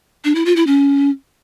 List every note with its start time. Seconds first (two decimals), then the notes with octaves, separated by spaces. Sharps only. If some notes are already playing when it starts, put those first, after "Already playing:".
0.24 D4
0.35 E4
0.46 F4
0.56 E4
0.67 C#4